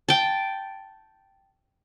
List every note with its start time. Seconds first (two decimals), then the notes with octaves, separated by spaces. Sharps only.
0.09 G5 A5